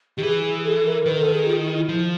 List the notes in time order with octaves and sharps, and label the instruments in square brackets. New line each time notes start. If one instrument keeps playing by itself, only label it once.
[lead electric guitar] D#3 [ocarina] G4
[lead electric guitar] E3 [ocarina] G#4
[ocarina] A4
A#4
[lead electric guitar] D#3 [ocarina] B4
[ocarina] A#4
A4
G#4
F4
E4
E4
[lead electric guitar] F3